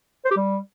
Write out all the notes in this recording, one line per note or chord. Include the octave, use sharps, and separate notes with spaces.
C5
G4
G3